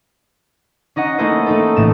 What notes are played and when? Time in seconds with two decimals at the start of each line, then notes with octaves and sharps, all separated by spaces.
0.96 C#4 D#4 D#5 F#5
1.18 A3 A#3 C#4 E4 C5 D#5
1.46 A3 D#4 A4
1.76 A1 A2 E7